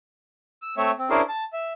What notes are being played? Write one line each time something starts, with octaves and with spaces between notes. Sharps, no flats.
E6
A3 C4 C#5 E5
C4
C#4 D4 E4 G#4 A#4 C5
A5
E5